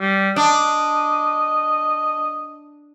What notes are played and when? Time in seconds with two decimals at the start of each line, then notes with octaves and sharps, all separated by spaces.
0.01 G3
0.36 D4 D#5